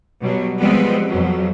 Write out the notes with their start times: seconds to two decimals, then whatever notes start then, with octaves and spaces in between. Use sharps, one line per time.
0.22 B2 F#3 G3
0.59 F3 G3 G#3 B3 C4 B4
1.09 F2 B2 F3 F#3